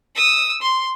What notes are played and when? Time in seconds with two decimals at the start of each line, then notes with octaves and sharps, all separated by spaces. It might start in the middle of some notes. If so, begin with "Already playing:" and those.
0.16 D#6 E6
0.62 C6